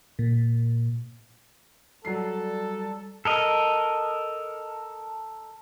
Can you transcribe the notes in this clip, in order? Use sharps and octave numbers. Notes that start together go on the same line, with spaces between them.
A#2
F#3 G3 A4 C7
A4 A#4 D#5